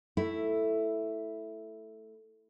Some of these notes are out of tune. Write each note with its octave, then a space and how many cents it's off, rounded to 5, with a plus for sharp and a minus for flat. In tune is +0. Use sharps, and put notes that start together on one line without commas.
A3 +0 E4 +0